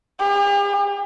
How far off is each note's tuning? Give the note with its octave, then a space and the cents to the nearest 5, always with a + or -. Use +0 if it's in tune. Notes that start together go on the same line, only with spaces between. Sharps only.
G4 +45